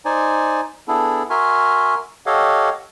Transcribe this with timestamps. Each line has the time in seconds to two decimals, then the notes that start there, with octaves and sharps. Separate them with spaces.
0.05 D#4 C5 D5 G#5
0.88 B3 D4 E4 G#4 A4
1.30 F#4 A#4 E5 G#5 C6 F6
2.26 G4 A4 C#5 D#5 F5 F#5